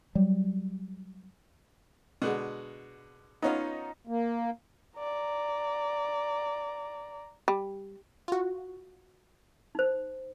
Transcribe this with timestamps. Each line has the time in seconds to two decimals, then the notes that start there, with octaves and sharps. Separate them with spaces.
0.15 F#3 G3
2.22 B2 D3 G#3
3.42 B3 C#4 D#4 F4
4.07 A#3
4.99 D5 A#5
7.48 G3
8.28 F4 F#4
9.75 D#4 C5